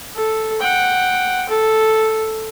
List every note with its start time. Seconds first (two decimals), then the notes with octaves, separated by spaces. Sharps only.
0.15 A4
0.61 F#5 G5
1.49 A4